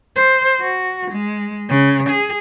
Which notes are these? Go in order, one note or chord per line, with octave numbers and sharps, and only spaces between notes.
C5
F#4
G#3
C#3
G#4